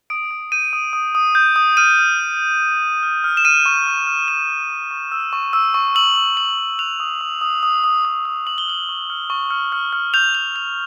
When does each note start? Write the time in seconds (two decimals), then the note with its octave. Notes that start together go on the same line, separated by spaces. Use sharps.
0.10 D#6 D7
0.31 D#6
0.52 G6 D#7
0.73 D#6
0.93 D#6
1.15 D#6
1.35 G6
1.56 D#6
1.77 F6 D#7
1.99 F6
2.19 F6
2.41 F6
2.60 F6
2.82 F6
3.03 F6
3.24 F6
3.37 E7
3.45 F6 D#7
3.66 C#6
3.87 F6
4.07 F6
4.28 F6 E7
4.50 C#6
4.70 C#6
4.91 C#6
5.12 E6
5.33 C#6
5.53 E6
5.74 C#6
5.95 E6 F#7
6.17 E6
6.37 C#6 F#7
6.58 C#6
6.79 F#6 F7
7.00 D#6
7.21 D#6
7.41 D#6
7.63 D#6
7.84 D#6
8.05 D#6
8.25 D#6
8.47 C#6 F#7
8.58 G7
8.67 F6 F#7
8.89 C#6
9.10 F6
9.30 C#6
9.50 F6
9.72 F6
9.93 F6
10.14 G6 F7
10.34 G6 F7
10.55 G6 F7